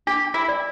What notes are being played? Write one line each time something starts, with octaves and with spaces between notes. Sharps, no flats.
D4 G4
E4
D5